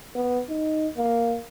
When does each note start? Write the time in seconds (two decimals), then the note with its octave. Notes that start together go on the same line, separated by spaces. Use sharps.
0.15 B3
0.49 D#4
0.97 A#3